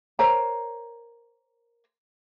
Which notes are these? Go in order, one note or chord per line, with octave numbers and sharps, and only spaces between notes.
A#4 C5 C#5 A#5